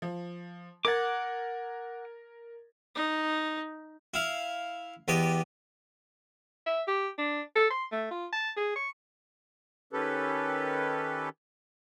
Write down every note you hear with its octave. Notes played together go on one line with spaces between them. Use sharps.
F3
A#4 F#5 D6 G#6 A6
D#4
E4 F5
E2 B3 G4 D#5
E5
G4
D4
A4
C6
A3
F4
A5
G#4
C#6
D#3 C#4 G4 A4 B4